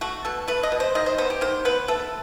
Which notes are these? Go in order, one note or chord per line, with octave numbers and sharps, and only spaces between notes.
A3 F#4
B2 A4
A3 B4
D#5
B2
C5
D#3 D#5
C5
B3 C5
G4
D#3 C5
B3 B4
A3 A4